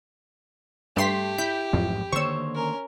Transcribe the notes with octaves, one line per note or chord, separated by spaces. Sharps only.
G2 A3 G4 C6 B6
E4 G6 B6
A1 F2 G#2 F#3
D3 D#3 A#3 C5 C#5 C#6 E6
C#4 A#4